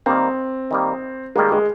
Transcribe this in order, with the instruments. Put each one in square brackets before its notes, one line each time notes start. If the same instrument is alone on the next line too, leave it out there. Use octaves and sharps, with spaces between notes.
[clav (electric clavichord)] D#3 G3 A#3 [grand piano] C4
[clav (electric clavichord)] D#3 G3 A#3
[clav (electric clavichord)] D#3 G3 A#3 [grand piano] G#3
[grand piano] G#3